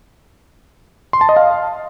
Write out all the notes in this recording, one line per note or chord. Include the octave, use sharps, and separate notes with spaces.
C6
A5
D#5
F5